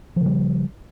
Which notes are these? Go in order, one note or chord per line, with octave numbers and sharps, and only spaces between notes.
C#3 F3 G3